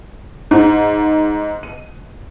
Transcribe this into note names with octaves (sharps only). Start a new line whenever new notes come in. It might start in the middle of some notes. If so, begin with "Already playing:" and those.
G#2
D#7